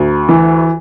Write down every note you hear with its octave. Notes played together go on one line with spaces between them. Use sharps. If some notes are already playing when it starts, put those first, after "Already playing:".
Already playing: D2
E3